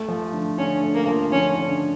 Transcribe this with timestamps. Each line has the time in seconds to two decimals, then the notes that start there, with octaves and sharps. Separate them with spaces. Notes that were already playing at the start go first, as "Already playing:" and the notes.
Already playing: A3
0.08 F3
0.33 D3
0.58 D3 C#4
0.82 A3
0.94 A#3
1.07 F3
1.31 D3 C#4
1.55 D3